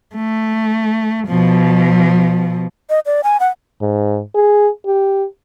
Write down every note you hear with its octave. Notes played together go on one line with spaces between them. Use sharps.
A3
B2 F3
D#5
D5
G#5
F#5
G#2
G#4
G4